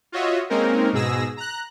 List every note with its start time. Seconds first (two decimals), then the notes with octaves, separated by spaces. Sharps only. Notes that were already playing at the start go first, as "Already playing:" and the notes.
0.12 F4 F#4 C#5 D#5 E5
0.50 G#3 A#3 C4 C#4 D#4 A#4
0.93 G#2 B2 G#4 E6 A#6
1.37 A#5 F#6